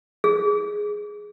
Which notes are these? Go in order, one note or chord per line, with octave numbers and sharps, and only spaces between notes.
G#4